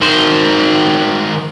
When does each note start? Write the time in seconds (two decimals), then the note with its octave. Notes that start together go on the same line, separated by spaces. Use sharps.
0.01 D#3 C5